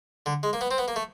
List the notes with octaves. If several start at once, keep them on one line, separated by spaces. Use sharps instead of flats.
D3
G#3
A#3
B3
C4
B3
A#3
A3